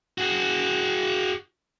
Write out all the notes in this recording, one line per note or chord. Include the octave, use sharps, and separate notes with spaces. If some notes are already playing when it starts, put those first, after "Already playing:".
F#4 G#4